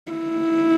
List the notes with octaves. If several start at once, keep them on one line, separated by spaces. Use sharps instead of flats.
E4